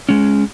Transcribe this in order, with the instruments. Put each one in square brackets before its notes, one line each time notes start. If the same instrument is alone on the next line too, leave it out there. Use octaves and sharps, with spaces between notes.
[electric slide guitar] G#3 C#4